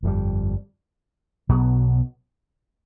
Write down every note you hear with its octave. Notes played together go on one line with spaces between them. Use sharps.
G1 F2 D3 G3
B1 B2 F#3 B3